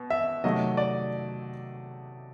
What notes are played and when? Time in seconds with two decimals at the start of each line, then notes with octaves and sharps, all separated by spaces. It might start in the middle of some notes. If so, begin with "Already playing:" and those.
Already playing: B2
0.10 E5
0.44 C3 D#3 F#3 A3 D#5
0.77 D5